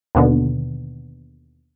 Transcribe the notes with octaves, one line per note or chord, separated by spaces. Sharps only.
D#2 B2 D3